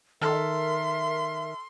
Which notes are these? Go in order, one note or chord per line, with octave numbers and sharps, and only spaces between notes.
D#3 A4 A#4 E5 C6 F6